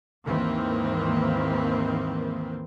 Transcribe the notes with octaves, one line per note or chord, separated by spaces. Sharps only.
D#2 G#2 D#3 E3 A#3 C4